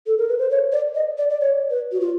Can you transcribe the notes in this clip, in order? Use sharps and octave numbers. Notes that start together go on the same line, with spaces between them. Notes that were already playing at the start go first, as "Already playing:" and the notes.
A4
A#4
B4
C5
C#5
D5
D#5
D5
D5
C#5
B4
F#4
F4